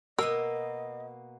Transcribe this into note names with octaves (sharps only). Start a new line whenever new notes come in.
B2 A#3 B3 A#4 D#5 E6